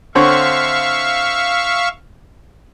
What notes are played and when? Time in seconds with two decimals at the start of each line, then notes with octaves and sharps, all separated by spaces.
0.15 D3 C4 C#5 E5 F5 C#6